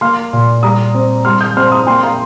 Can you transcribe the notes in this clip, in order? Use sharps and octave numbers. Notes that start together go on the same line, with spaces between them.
A#3 C6 F6
A#2
G3 A#5 D#6
C4
G3 C6 F6
D#6 G6
C4 C6 F6
C6
A#5 D#6
A#3 G5 C6
F5 A#5